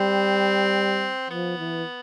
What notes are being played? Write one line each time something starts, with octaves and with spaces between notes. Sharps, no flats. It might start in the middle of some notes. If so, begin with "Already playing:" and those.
Already playing: G3 C4
F3 B3
E3